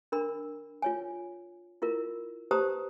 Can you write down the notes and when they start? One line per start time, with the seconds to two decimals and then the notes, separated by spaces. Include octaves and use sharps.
0.12 D4 A#4 B5
0.82 F4 C#5 G#5
1.82 E4 F4 A#4
2.51 G4 B4 C5 A5 A#5 D#6